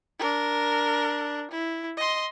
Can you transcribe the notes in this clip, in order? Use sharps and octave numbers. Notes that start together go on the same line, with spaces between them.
D4 A#4
E4
D#5 C6